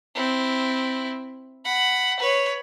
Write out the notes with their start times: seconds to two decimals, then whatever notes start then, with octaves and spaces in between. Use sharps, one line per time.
0.15 C4 E4
1.65 F#5 B5
2.20 B4 C#5